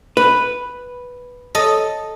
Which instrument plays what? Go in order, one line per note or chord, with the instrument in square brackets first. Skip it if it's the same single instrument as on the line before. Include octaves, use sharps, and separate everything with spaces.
[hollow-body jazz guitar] B4
[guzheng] A4 D#5